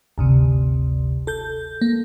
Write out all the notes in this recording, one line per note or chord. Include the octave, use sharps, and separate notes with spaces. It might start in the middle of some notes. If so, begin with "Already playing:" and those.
G1 D2 C3
A4 G6
A#3